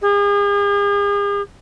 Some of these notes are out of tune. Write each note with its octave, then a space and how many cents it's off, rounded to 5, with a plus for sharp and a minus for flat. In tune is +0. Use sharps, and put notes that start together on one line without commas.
G#4 -40